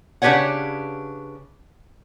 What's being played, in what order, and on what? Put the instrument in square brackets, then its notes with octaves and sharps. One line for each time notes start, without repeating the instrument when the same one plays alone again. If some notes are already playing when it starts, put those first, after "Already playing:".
[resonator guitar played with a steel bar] C#3 D4 G4 B4 C#5 F#5